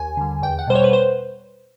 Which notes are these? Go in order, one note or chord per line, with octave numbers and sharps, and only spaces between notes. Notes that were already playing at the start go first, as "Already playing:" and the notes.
Already playing: D#2 G#5
D3 G3
E2 G5
F#5
B2 G3 C5
C#5
B4
C5